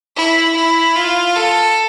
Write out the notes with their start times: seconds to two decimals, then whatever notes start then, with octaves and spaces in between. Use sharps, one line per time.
0.16 E4
0.55 E4
0.96 F4
1.35 A4